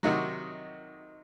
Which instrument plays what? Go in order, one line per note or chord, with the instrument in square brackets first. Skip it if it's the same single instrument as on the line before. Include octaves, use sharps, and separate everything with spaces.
[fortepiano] C3 D#3 F#3 D#4 F#4